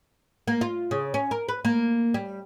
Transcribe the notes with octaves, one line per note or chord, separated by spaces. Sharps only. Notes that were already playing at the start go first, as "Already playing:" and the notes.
A#3
F4
C#3
C#4
A#4
B4
A#3
G3